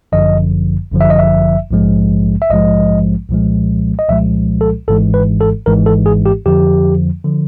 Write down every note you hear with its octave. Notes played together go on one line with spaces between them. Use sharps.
G1 F#2 D3 F3 D#5
G1 F#2 D3 F3
E5
D#5
E5
A#1 G#2 F3 G#3
E5
A#1 G#2 F3 G#3 D#5
C2 A#2 F3 G#3
D#5
C2 A#2 F3 G#3 E5
A4
G#1 G#2 E3 G#3 A4
B4
A4
G#1 G#2 E3 G#3 A#4
A4
G#4
G4
F2 D3 F3 G4
D3 F3